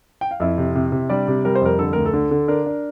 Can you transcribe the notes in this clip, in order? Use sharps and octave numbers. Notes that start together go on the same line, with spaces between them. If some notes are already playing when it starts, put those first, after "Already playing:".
G5
F5
F2 E4 E5
C3
C3
C3
G3 D4 D5
C3
G3 A#4
C5
F2 A#4
D3 A4
D2 A#4
A4
D3
D3
D4 A#4
D4